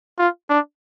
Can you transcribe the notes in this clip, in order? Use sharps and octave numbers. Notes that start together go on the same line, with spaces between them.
F4
D4